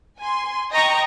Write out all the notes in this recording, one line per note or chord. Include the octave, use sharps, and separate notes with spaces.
G#5 C6
D#5 G5 A#5 C#6